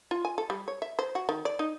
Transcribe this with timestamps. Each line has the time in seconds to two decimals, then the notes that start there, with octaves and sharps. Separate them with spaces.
0.11 F4
0.25 G#5
0.38 A4
0.50 G3
0.68 C#5
0.82 E5
0.99 C5
1.15 F#4
1.29 D#3
1.45 D5
1.59 D#4